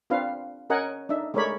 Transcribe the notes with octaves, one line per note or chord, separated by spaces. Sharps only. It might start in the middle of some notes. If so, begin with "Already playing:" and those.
C4 D4 F4 B4 F5
C#4 A#4 D#5 F#5 G#5
D4 D#4 E5
G#3 A3 A#4 C#5 D5 B5